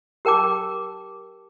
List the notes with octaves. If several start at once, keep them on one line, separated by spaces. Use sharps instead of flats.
G4 A#4 G5 A5 D6